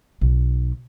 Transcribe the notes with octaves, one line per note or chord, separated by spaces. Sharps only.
B1